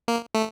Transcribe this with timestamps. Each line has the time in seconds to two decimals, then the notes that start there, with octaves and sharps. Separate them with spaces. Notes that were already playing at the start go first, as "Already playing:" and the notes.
0.08 A#3
0.34 A3